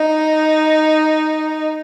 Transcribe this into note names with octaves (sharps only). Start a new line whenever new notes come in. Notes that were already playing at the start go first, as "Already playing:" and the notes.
Already playing: D#4